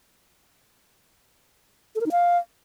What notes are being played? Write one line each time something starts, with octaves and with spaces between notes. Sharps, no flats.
A4
A#4
D#4
F5